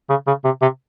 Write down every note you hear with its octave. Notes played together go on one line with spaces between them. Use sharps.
C#3
C#3
C3
C3